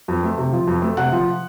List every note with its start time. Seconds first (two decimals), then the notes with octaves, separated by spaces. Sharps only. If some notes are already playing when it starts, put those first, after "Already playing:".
0.08 F2
0.23 A3
0.38 C3
0.52 F3
0.67 F2
0.82 A3
0.97 C3 F#5
1.12 F3